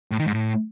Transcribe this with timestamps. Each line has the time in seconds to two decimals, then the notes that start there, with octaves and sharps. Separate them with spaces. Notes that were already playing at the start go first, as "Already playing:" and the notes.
0.11 A2
0.19 D#3
0.26 G#2
0.34 A2